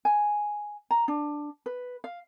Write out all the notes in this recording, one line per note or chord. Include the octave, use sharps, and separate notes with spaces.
G#5
A#5
D4
B4
F5